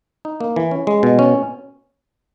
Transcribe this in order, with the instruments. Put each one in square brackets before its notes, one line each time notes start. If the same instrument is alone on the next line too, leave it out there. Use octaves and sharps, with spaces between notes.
[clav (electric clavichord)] D#4
A#3
E3
C#4
G#3
B2
C#4